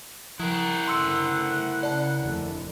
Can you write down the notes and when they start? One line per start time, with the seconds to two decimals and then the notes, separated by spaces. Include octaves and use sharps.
0.40 F3 E4 A#4 F#5
0.88 F#2 D3 A3 C6 E6 C#7
1.83 C#3 D5 A5
2.20 F1 D#2 D3